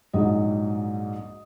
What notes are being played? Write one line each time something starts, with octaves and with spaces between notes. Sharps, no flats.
A#1 G#2 F#3 D#5